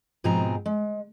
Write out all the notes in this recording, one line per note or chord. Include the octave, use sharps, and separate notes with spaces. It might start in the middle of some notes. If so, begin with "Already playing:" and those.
G#2 B2 F3 C4 G#4 A#5
G#3